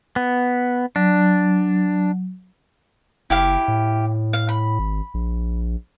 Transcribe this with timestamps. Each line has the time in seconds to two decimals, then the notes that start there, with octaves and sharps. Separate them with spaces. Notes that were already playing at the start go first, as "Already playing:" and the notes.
0.16 B3
0.96 F#3 D4
3.30 F#1 E4 G4 F5
3.68 A2
4.33 F5
4.49 B5
4.79 G#1
5.14 A#1